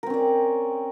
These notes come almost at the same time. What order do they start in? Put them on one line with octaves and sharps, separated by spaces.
A#4 C4 C#4 D5